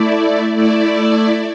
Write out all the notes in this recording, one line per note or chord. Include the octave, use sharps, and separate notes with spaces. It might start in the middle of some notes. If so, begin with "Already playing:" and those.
Already playing: A3 E4 D5
A3 E4 D5